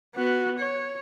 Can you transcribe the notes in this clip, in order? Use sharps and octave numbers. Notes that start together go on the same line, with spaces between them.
B3 F#4
C#5